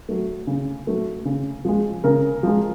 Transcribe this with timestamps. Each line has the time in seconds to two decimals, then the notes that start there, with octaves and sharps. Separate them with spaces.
0.09 F#3 A3
0.47 C#3
0.87 F#3 A3
1.25 C#3
1.65 F3 G#3
2.04 C#3 A#4
2.43 F3 G#3